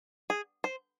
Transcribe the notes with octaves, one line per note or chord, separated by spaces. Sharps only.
G#4
C5